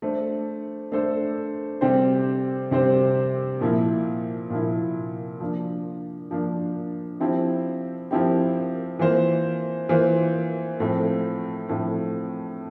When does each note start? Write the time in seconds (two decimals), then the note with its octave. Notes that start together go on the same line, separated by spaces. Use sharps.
0.02 A3 D4 A4 C5
0.92 A3 D4 A4 C5
1.81 C3 G3 C4 G4 C5
2.71 C3 G3 C4 G4 C5
3.61 A#2 F3 A#3 E4
4.50 A#2 F3 A#3 E4
5.40 F3 A#3 D4
6.31 F3 A#3 D4
7.20 F3 C4 E4 G4
8.11 F3 C4 E4 G4
8.99 E3 A#3 F4 C5
9.89 E3 A#3 F4 C5
10.80 A2 F3 A3 C4
11.69 A2 F3 A3 C4